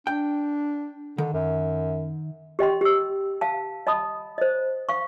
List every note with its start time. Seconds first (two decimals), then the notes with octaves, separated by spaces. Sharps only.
0.07 D4 G5
1.18 D3 D#3
1.33 F#2
2.59 G4 D#5 G5 C6
2.81 G4 E6
3.41 F5 A5
3.87 D#5 A5 B5 D#6
4.38 C5 D#5
4.89 F5 C#6